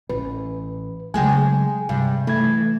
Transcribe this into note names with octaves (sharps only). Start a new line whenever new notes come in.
A1 B4
C#3 F#3 G#3 G#4 G5 G#5
G2 C3
E3 A3 G#6